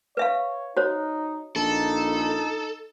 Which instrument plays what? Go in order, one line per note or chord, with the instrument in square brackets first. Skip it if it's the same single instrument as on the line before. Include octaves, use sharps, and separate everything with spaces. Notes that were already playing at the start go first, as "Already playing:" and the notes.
[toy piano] B4 E5 F5 [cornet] C#5
[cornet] D#4 [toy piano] F#4 C5 C#5
[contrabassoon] A#1 [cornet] D#4 [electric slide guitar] A4